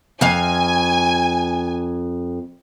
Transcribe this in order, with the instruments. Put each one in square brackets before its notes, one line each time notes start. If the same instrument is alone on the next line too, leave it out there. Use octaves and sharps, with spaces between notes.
[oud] F2 F5 [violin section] G#5